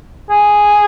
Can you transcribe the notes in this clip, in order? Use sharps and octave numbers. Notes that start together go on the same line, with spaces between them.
G#4